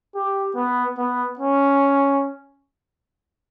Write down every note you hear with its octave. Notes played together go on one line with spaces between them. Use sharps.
G4
B3
B3
C#4